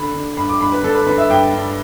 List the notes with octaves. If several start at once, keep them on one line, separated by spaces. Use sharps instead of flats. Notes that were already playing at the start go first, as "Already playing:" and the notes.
Already playing: D3 B5
D3
G2 B5
D6
G2 B5
B4
D3 A4
B4
D3 B4
E5
G2 G5
G2